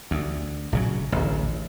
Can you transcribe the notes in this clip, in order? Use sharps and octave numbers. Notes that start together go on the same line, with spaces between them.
D2
A#1 C#3 F#3
D1 A1